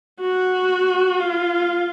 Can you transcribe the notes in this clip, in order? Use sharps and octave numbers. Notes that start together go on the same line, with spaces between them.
F#4
F4